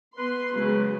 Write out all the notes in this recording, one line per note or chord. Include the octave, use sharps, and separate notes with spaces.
B3 B4 C6
C#3 F#3 G#3